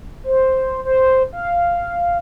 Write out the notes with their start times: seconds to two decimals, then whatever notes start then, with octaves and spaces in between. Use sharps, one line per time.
0.24 C5
0.85 C5
1.33 F5